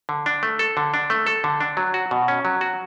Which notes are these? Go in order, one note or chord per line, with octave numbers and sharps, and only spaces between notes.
D3
D4
A3
A4
D3
D4
A3
A4
D3
D4
F#3
F#4
B2
C#4
F#3
F#4